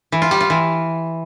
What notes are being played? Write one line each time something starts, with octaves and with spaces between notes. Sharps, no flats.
E3
F4
G3
F4
E3